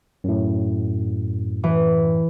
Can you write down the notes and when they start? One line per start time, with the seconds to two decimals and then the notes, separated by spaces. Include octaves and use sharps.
0.24 F#2 A2
1.64 E3